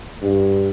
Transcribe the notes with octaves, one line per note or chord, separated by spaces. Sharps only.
G2